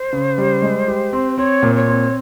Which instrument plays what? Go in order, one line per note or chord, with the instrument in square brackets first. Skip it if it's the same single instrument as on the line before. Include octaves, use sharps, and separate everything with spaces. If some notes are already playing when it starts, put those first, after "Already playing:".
Already playing: [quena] C5
[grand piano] C#3
G3
G#3
G4
C4
[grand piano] C4 [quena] C#5
[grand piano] A#2
[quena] C#5
[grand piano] C4